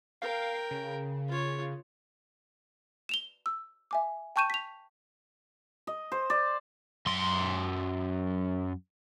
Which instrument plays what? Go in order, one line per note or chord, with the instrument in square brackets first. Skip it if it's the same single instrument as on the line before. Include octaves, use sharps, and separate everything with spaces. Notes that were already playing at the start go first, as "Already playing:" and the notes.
[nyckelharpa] A#4 G5 [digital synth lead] F5
[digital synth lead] C#3
[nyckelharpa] F4 C#5
[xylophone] E7 F7 G7
E6
E5 G#5 D6
G5 A5 C#6 G6 D#7 E7
B6 F7
[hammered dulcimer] D#5
C5
D5
[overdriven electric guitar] F#2 C6